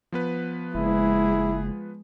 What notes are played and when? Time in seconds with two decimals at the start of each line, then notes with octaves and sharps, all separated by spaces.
0.12 F3 B3 B4
0.75 F#1 G#3 E4 G#4